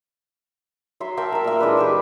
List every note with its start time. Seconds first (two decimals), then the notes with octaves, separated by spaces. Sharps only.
1.00 F#3 E5 C6
1.17 A#4 E5 G5 A5
1.32 A#4 E5
1.44 A#2 E5
1.60 E3 G#3 D4 B4
1.77 G4 B4 E5